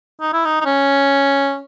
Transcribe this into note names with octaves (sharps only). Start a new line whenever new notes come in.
D#4
E4
D#4
D#4
C#4